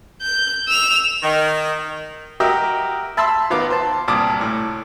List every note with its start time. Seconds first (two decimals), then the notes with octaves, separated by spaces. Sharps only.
0.21 G6
0.68 E6 F7
1.22 D#3
2.40 F#4 G4 A#4 D#5 E5
3.17 E5 A5 B5 C6 E6
3.50 D#3 B3 F4 D6
3.70 C5 A5
4.08 C2 G2 A#2 A5 D6 D#6
4.41 A2